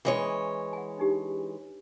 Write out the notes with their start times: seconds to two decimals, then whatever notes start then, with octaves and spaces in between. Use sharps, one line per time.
0.05 E3 G#3 C#4 C#5
0.73 F#5 G#5
0.98 D4 D#4 G4